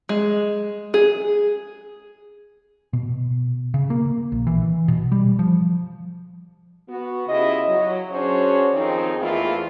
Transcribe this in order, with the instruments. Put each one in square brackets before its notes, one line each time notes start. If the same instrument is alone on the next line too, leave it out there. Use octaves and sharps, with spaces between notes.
[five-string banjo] G#3
G#4
[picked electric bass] B2
C#3
A#3
A#1
E3
B2
G3
F3
[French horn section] B3 F#4
C#3 E4 F4 G4 D#5
F#3
C#4 D4 F#4 G#4 C5 C#5
F2 D#3 F3 C4 D#4 G#4
E2 E3 A3 A#3 E4 F4